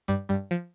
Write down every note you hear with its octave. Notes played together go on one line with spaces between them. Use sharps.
G2 G3
G2 G3
F3